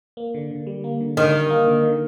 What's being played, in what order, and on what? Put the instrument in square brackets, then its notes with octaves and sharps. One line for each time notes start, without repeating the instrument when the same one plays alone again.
[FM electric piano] A#3
D3
D3
G3
A#3
D3
[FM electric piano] D3 [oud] D#3
[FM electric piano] G3
A#3
D3
D3